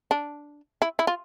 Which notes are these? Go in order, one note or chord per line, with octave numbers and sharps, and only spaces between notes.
D4
E4
E4
F4